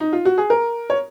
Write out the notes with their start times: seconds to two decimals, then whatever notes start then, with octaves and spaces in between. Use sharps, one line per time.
0.00 D#4
0.13 F4
0.25 F#4
0.38 G#4
0.50 A#4
0.90 C#5